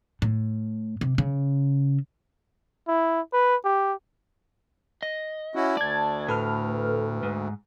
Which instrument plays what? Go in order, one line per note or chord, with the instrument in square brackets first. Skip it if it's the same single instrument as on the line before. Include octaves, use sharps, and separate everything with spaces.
[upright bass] A2
C3
C#3
[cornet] E4
B4
G4
[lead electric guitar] D#5
[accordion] C#4 E4 F#4
[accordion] D2 [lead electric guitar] D5 [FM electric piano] A5 G#6
[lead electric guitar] A2 [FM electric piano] A4 B4 F6
[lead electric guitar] G#2